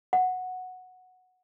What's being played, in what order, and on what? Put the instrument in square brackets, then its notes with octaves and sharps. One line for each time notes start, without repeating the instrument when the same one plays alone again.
[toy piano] F#5